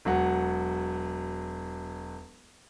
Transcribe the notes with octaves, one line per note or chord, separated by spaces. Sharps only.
E1 F#3 F#5